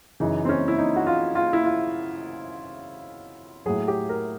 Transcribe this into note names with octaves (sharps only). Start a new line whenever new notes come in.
F#2 C#3 E3 D#4
C4
C#4
E4
D#4
F#4
F4
F4
E4
F4
A2 F#3 G#4
G4
A#4